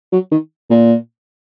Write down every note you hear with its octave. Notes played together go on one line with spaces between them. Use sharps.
F#3
D#3
A#2